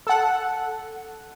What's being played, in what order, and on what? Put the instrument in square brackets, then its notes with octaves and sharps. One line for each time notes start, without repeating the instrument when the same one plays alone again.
[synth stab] A4 F#5